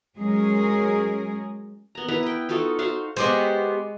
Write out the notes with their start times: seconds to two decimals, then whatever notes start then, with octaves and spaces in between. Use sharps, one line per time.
0.17 F#3 G#3 C#4 G#4 A#4
1.95 B3 A#5
2.08 B3 E4 B4 A#5
2.23 B4 G5
2.49 D#4 F4 F#4 A4
2.79 F#4 C5 F5 C6
3.17 G#3 B3 F#4 G4 C5